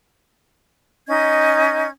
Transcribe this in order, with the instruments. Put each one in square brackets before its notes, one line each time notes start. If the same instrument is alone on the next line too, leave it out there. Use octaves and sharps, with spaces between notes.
[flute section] C#4 D#4 D#5 G#6